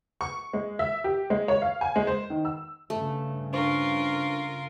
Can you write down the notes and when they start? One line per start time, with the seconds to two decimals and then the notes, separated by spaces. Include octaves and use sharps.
0.21 C#6
0.53 G#3
0.79 E5
1.04 G4
1.30 G#3
1.48 C#5
1.62 F5
1.81 G#5
1.96 G#3
2.07 C5
2.30 D#3
2.45 E6
2.90 G2 C#3 A3
3.53 D4 F4 A#4 C5 C#6